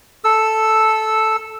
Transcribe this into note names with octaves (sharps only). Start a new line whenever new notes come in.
A4 E6